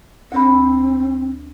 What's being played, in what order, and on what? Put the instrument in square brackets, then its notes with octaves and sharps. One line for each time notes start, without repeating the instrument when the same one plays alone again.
[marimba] D2 B5 [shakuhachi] C4